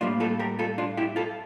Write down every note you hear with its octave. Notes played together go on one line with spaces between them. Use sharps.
A2 G3 A#3 D4 F4
F4 A4
G4 A#4
F4 A4
D4 F4
E4 G4
F4 A4